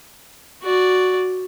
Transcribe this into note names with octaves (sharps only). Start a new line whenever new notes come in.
F#4 D5